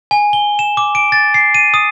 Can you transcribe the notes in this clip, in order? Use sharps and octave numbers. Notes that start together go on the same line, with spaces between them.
G#5
G7
E7
D6
D7
A6
C7
D#7
D#6